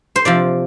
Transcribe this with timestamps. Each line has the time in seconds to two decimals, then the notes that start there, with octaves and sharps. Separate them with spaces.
0.16 C5
0.25 C3 F3 D5